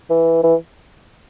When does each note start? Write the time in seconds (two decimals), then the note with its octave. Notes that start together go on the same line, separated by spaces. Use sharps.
0.10 E3
0.43 E3